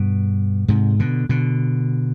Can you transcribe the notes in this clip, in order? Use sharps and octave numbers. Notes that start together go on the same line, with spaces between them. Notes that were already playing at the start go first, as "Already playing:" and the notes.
Already playing: G2 B2
G#2 C3
B2 D3
B2 D3